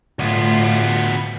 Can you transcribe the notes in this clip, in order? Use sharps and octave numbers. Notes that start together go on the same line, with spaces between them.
D2 A2 B3 F4